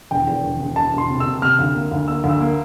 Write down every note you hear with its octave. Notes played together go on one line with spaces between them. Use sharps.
E1 G5
E2
E1
E1
E1 A5
E1
C6
C3
E6
C3
C3 F6
D2
A#3
D2
A#3 E6
D2
E6
A#3